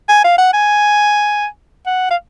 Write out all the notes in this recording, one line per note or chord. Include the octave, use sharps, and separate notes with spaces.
G#5
F5
F#5
G#5
F#5
F5